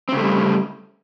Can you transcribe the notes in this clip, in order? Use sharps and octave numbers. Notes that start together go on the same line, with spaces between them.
C#3 G3 A3 C4